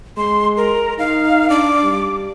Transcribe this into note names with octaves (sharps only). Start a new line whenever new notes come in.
G#3 C6
A#4
D#4 F5
D4 D6
G3